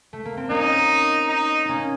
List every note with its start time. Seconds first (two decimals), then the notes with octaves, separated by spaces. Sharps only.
0.13 A3
0.25 A#3
0.37 C4
0.49 A#3 C#4 D#4
1.29 D#4
1.65 A#3 C#4 D#4